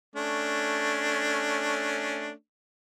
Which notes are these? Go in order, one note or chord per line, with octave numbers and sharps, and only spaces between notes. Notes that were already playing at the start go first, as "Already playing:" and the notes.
A3 C#4 D4